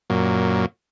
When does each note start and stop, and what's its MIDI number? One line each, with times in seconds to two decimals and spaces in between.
0.10 0.66 42
0.10 0.66 46